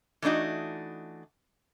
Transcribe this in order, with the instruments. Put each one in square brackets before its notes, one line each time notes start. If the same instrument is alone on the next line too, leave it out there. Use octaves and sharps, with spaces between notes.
[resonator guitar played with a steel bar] E3 A3 D4 D#4 F#4